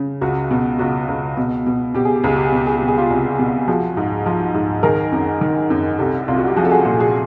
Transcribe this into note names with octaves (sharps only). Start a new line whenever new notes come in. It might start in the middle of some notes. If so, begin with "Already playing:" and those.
Already playing: C#3
C#2 F#4
B2
C#2 F#4
C#2
B2
B2
B2 G4
G#4
G4
C#2 G#4
G4
G#4
B2 G4
G#4
B2 G4
G#4
F4 G4
C2
B2
F3 F#4 G#4
G#2
F3
G#2
D#3 G#4 A#4
F#2
D#3
F#2
C2 G4 A4
C2 F4
F#4
G4
F3 F#4 G#4
A4
F#4 G#4
A#2 G4 A4
F#4 G#4